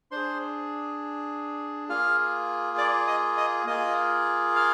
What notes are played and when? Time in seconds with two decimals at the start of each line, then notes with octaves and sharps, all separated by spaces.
0.11 D4 G#4 C5 C6
1.89 A#3 F4 G#4 F5 F6
2.78 D5 D6
3.07 D#5 D#6
3.37 D#5 D#6
3.66 A#3 F4 G#4 D#5 D#6
4.55 F5 F6